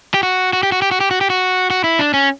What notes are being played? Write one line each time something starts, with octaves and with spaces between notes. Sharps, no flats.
G4
F#4
F#4
G4
F#4
G4
F#4
G4
F#4
G4
F#4
F#4
E4
D4
C#4